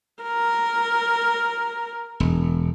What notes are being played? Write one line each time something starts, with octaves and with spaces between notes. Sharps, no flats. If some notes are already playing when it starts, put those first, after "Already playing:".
A#4
E1